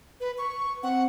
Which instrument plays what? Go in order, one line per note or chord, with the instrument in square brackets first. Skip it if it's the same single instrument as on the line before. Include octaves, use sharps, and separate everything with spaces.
[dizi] B4
C#6
[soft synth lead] C4 [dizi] F#5